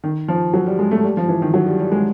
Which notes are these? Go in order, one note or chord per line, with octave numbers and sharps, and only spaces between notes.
D#3
F3
F#3
G3
G#3
A3
G3
F3
E3
D#3
F#3
G3
G3
G#3